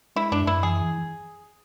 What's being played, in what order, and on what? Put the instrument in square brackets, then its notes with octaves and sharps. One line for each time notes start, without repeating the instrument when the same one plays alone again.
[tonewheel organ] G#3 [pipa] E4
[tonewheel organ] F#2 [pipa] D4
[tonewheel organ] F#2 [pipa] E4
[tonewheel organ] E3 [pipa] G#4